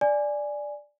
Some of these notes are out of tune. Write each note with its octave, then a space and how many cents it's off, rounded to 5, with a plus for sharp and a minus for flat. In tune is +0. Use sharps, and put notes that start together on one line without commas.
D5 +0 G#5 +0